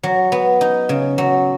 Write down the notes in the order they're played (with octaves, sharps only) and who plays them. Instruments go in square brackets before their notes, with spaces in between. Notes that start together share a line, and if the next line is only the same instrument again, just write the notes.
[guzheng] F#3
B3
D#4
C#3
F#3